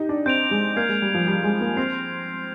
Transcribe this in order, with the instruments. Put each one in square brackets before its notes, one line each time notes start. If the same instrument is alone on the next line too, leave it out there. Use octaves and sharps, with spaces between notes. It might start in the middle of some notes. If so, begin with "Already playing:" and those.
Already playing: [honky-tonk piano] D#4 G4
D4
[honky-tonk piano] C4 [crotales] G6 D7 F7
[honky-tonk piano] G#3
[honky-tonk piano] A#3 [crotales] F6 G#6 C7
[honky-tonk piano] G#3
G3
F3
[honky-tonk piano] G3 [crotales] F6 G#6 C7
[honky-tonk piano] G#3
A#3
[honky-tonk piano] C4 [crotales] F6 G#6 C7